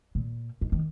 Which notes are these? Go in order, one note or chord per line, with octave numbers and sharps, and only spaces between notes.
A#2
D#3
D#3